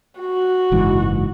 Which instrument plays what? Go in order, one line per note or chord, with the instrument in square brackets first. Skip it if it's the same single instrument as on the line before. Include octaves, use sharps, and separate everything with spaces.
[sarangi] F#4
[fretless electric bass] F#1 G#2 E3